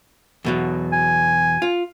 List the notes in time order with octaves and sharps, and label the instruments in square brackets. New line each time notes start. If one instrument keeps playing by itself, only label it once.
[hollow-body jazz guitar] E2 B2 F#3
[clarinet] G#5
[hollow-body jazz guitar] F4